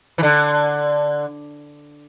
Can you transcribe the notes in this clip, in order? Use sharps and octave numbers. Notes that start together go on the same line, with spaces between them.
E3
D3